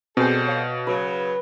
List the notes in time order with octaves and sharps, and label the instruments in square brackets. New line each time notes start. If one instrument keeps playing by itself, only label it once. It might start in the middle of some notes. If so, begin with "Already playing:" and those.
[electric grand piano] B2 [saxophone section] G3 A4 C5 [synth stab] C4 G#4
[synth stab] C#5 F5
[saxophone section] C#3 F#3 [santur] B4